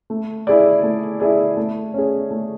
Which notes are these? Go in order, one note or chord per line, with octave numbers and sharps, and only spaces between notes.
A3
E4 G#4 D5
A3
E4 G#4 D5
A3
C#4 G#4
A3